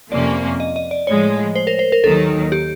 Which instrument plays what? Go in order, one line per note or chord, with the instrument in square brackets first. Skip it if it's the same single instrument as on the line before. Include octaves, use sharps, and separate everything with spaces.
[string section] F2 C3 F3 A#3 C#4 [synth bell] D5
[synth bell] D#5
D#5
D5
[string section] A2 F3 G#3 [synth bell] C#5
[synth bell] C5
A#4
C5
A#4
[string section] D#2 D#3 F#3 [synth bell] A4
[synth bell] G4